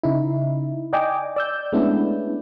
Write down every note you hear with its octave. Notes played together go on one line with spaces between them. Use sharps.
C#3 D#4 E4
D5 D#5 G5 G#5 D6
D5 E6 G6
G#3 A3 B3 C#4 D4 E4